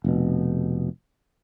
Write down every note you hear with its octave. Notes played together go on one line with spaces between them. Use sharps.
F1 B2